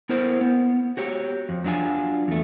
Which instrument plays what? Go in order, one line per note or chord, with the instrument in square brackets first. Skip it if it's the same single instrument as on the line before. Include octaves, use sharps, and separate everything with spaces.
[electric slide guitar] B3 E4 A#4 C5
B3
F#4 G4 C#5
F2
F#3 D4 F4 G#5
E2 A3